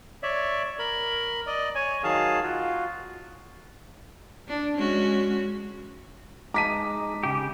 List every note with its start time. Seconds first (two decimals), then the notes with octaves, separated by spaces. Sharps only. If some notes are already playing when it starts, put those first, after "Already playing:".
0.23 C#5 D5 E5
0.79 A#4 B5
1.47 D5 D#5
1.75 C#5 G#5
2.04 D#3 F#3 G#4 F5 A5
2.43 F4 F#4
4.48 D4
4.77 G#3 C#4 F#4
6.54 G#3 D#4 A5 A#5 D6 B6 D#7
7.23 C#3 G4